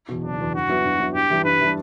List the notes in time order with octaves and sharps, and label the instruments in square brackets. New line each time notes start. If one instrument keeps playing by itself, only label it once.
[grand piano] E2 B2
[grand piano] F#1 [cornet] D4
[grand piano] E2 B2
[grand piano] G2 [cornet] F#4
[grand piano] F#3 B3 E4
G2
F#3 B3 E4
[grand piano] G2 [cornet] G4
[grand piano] E3 G3 D4
[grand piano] G2 [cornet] B4
[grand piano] E3 G3 D4